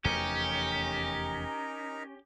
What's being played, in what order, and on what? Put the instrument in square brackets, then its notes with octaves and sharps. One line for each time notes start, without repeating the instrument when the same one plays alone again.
[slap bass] F1 E2 A3 [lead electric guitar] C#4 [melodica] D#4 A#4 A#5 [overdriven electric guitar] G4